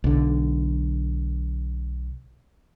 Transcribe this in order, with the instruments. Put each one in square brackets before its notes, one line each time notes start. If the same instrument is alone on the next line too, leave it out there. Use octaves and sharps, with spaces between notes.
[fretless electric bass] B1 D3